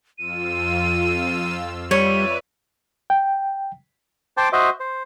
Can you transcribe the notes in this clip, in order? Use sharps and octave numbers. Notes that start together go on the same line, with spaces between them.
F2 F4 E6 D#7
G3 B4 C#5 D5 E5 D#7
G5
C5 G5 A5 D6
F#4 C5 D#5 E5
C5